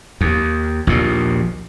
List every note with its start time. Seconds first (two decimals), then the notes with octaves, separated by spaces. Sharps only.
0.21 D#2
0.87 A#1 D#2 A#2